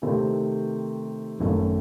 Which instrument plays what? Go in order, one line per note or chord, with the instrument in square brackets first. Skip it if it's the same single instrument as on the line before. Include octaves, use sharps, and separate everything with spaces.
[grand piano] C3 D#3 A3 C4 D#4
G#1 F#2 D#3 A3